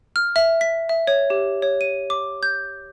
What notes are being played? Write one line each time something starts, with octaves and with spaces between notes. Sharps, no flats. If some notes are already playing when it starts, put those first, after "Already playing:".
F6
E5
B6
E5
C#5
G4
C#5
D#7
D6
G6